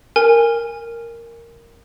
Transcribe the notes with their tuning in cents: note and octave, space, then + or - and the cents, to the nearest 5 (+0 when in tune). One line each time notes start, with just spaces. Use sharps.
A#4 -5 G#5 -20